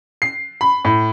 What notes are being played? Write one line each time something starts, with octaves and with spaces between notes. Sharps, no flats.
C7
B5
A2